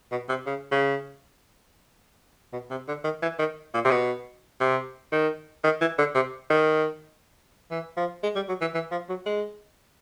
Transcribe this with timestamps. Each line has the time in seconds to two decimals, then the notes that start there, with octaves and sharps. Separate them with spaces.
0.12 B2
0.29 C3
0.46 C#3
0.72 C#3
2.53 B2
2.71 C3
2.88 D3
3.04 D#3
3.22 E3
3.39 D#3
3.74 A#2
3.85 C3
3.91 B2
4.60 C3
5.12 D#3
5.64 D#3
5.81 E3
5.98 D3
6.15 C3
6.50 D#3
7.71 E3
7.97 F3
8.23 G#3
8.36 G3
8.49 F#3
8.61 E3
8.74 E3
8.92 F3
9.09 F#3
9.26 G#3